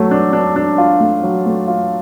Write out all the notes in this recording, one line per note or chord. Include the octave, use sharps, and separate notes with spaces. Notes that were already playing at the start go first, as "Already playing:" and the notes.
Already playing: F#3 A3
D4
D4
D4
F4
A3
F#3
A3
F4